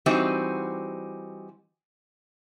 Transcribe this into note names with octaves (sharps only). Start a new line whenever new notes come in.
E3 G3 C4 D#4 F#4